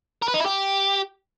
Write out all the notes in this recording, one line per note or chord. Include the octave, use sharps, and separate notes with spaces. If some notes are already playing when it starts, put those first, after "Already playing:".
A#4
B4
D#4
E4
G4